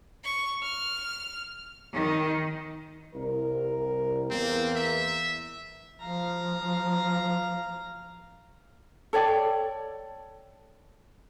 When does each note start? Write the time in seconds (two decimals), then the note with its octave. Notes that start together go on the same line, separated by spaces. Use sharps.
0.25 C#6
0.63 F6
1.93 D#3
3.14 C2 A#4
4.30 E2 A#3 C4
4.75 E5
6.00 F3 F5 A#5
9.13 A4 C#5 D5 G5